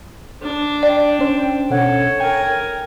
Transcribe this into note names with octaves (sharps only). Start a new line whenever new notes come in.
D4
D5 G5
C#4 C5
B2 C#4 A4 C#5 F#5
A#4 G5 G#5